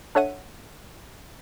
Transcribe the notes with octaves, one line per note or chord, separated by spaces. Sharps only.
D4 A4 C#5 E5 F#5 D#7